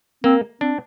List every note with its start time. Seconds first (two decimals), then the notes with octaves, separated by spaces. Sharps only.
0.24 A#3 C4
0.61 C4 D4